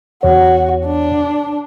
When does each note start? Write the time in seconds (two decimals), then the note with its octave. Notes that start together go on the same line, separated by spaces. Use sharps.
0.23 E2 F#4 C#5
0.86 D4